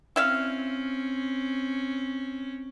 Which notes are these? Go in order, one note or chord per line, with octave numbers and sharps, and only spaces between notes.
C4 C#4 E4 E5 F5